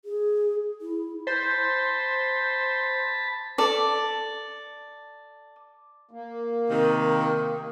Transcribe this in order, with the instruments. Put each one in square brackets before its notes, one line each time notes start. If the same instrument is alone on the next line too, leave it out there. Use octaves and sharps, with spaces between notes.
[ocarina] G#4
E4
[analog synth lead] C5 [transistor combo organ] A5 B5
[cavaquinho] A4 D5
[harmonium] A#3
[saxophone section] C3 D#3